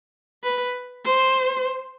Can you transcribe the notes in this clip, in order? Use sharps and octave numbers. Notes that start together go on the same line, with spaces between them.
B4
C5